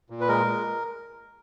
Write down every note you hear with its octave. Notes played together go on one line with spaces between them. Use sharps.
A#2
B4
G#3 A#4
G#3